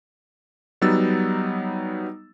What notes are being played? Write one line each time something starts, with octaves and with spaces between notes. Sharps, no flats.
F#3 G3 B3 D#4 E6 A6